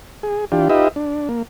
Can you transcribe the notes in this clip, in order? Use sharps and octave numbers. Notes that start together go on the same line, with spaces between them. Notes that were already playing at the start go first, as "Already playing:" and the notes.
G#4
E3 D4 F4 G4
D#4 F4 G4 B4 D#5 E5
D4
A#3